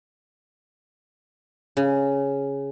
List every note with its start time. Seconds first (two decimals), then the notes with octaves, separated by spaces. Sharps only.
1.77 C#3